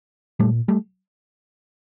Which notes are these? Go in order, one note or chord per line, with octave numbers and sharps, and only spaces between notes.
A#2 G3 A3
G3 A3